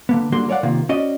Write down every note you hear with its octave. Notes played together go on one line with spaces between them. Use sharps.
D3 A#3 B3
D3 G3 A#3 F#4 C6
A#4 C#5 D5 F5 F#5
C3 D#3 A#3 F4
C#4 F#4 D5 D#5